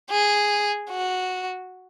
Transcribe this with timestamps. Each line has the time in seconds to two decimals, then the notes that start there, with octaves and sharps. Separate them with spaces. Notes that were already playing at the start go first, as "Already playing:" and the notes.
0.11 G#4
0.90 F#4